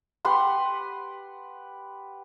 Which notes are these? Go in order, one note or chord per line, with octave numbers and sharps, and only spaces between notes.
G4 B4 F#5 C6